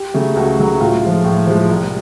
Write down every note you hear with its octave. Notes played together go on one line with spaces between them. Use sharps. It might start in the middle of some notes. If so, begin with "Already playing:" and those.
Already playing: G4
C#3 F#3 A3
C#2 F#4
C#3 F#3 A3
A2 F4
F3 G#3
A2
F3 G#3
C2